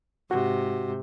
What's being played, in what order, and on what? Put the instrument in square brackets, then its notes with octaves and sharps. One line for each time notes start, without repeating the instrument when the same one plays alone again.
[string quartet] G#2 C3 [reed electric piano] F#4